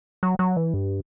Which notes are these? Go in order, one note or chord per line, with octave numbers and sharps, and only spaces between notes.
F#3
F#3
E3
G2